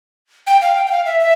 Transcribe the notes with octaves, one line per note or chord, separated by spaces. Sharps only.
G5
F5
G5
G5
F5
E5
E5